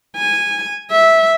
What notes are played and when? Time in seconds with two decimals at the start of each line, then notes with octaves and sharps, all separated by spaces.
0.17 G#5
0.91 E5